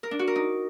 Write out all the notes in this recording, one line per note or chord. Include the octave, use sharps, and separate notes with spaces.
A#4
D4
F#4
A#4
D#4